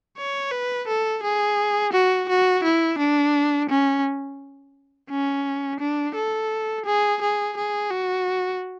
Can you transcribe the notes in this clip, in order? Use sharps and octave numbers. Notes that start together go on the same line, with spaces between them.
C#5
B4
A4
G#4
F#4
F#4
E4
D4
C#4
C#4
D4
A4
G#4
G#4
G#4
F#4